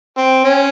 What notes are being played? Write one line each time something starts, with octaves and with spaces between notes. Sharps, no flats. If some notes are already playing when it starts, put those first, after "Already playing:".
C4
C#4